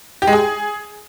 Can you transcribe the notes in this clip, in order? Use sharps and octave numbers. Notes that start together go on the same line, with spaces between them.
G4
G#3
G#4